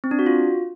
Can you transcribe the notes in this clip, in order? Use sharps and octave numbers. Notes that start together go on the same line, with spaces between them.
C4
D4
F#4
F4